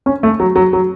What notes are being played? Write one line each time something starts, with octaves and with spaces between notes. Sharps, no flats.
C#4
A3
F#3
F#3
F#3